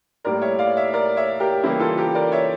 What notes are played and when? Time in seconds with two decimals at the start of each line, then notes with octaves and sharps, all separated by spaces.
0.24 A2 G3 A#3 A#4 D5
0.42 C#5 E5
0.59 D5 F5
0.77 C#5 E5
0.93 A#4 D5
1.17 C#5 E5
1.40 G4 A#4
1.64 C#3 E3 G3 A#3 E4 G4
1.80 F4 A4
1.97 G4 A#4
2.15 A#4 D5
2.32 C#5 E5